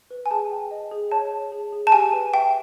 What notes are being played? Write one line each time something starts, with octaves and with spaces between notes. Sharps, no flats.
B4
G#5
G#4 A5
G5
D#5
G#4
C#5 A5
C#5
G#4
G#4
A5
G4 G#5
B4
E5 G5